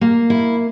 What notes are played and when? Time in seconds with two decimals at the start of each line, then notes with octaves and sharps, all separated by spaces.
0.01 A#3
0.30 E4